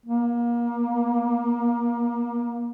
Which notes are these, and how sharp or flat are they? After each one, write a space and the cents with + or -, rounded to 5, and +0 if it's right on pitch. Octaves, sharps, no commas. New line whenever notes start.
A#3 +30